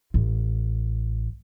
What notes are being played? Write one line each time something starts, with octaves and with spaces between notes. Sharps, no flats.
A1